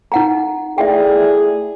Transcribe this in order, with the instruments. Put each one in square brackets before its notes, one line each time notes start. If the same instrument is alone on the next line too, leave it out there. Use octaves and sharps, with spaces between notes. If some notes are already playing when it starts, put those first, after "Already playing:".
[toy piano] D#4 F#5 A#5
[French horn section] A3 E4 D5 [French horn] G#4 [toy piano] E5 G5